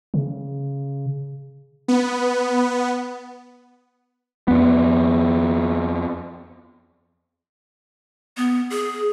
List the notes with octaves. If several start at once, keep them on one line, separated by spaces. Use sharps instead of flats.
C#3
B3
F2 B3
B3
G#4